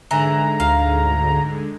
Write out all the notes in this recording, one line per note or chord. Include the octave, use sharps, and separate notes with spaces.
G#2 D3 E3 G#3 A#5
D2 F5